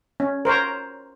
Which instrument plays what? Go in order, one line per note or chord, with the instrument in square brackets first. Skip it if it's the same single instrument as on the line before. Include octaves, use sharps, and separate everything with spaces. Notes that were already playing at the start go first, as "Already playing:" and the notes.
[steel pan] C#4
A#4 C5 C#5 A#5